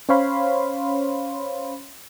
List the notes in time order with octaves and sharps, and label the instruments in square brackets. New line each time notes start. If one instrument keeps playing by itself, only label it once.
[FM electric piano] C#4 C5 C#5 F5 B5 C6